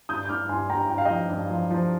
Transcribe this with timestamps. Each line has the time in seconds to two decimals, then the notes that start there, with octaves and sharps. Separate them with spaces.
0.09 G2 D#6 G6
0.25 G6
0.29 G2 D6 F6
0.49 G2 G#5 C6
0.70 G2 G5 A#5
0.90 G2 G5
0.98 F5
1.05 F3 D#5 G5
1.30 G2
1.50 F3
1.70 F3